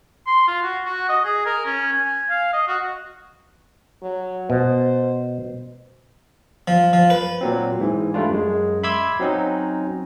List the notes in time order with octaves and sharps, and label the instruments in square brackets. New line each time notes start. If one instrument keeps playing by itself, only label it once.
[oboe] C6
F4
F#4
F#4
D#5
G#4
A#4
C#4
G#5
F5
D#5
F#4
[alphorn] F#3
[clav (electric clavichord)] B2 [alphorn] C5
[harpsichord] F3
F3
B4
[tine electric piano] A#2 F#3 C4
G#2 E3
G3 A3 D4 F4
F#2 G#3
E5 B5 C6 D6 E6 G#6
F#3 C4 C#4 D#4